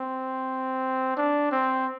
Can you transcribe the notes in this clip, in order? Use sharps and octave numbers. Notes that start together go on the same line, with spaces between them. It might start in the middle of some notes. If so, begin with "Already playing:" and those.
Already playing: C4
D4
C4